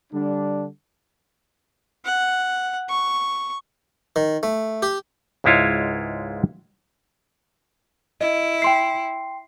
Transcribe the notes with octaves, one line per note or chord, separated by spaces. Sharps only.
D3 G3 D4
F#5
C#6
D#3
A3
G4
C#2 G#2 G#3 E4 F4 C#5
E4 D#5
G5 C6 C7